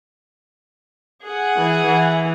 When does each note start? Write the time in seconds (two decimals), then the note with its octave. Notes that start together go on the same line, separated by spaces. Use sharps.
1.25 G#4 F#5
1.57 E3
1.87 E3